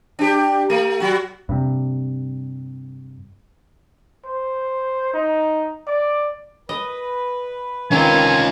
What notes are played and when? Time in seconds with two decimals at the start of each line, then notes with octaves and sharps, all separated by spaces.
0.19 D4 G4
0.70 A3
1.00 F#3 F#4
1.49 G2 C3
4.26 C5
5.14 D#4
5.87 D5
6.69 B4 D#5
7.92 D#3 C4 C#4 F4 G#5